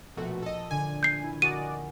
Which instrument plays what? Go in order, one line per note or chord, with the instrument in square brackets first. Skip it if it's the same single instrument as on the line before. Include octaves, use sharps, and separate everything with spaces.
[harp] A#1 [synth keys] B2 A3 F#4
[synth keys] A4 D#5
[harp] D3 [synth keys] G#5
[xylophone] G6 C7
[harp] E4
[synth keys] F#4 D5 D#5 [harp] A#4 F#5 G#5 [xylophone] D#7